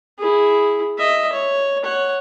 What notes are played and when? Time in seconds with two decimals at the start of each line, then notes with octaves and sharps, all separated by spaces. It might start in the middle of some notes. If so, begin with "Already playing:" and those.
0.18 E4 G#4
0.98 D#5 E5
1.33 C#5
1.84 C#5 F#5